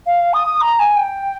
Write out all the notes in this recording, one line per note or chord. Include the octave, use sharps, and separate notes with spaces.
F5
D#6
A#5
G#5
G5